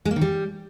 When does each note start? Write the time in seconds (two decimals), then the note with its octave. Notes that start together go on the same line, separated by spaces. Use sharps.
0.05 G#3
0.11 A#3
0.16 D#3
0.21 G3